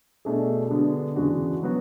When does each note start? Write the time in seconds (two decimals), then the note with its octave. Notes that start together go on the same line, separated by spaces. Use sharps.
0.25 B2 A3 D4 G#4
0.71 D3 G#3 B3 D4
1.16 E2 C#3 G#3 D4 F#4
1.63 F#3 B3 F#4